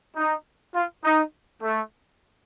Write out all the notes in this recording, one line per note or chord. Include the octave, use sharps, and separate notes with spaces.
D#4
F4
D#4
A3